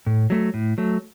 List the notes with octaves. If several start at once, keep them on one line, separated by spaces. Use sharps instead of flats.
A2
F#3 A3
A2
F#3 A3